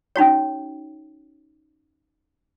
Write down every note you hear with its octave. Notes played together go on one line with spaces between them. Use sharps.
C#4 D#4 F#4 C#5